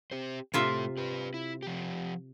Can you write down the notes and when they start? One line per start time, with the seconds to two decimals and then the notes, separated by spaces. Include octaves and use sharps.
0.11 C4 G4 C5
0.54 A2 C3 A3 F4 E5
0.97 G4 B4
1.34 E4
1.62 F3 G4